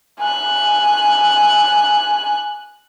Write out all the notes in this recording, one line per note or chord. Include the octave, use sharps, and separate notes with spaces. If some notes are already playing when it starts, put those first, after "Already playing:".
G#5 F#6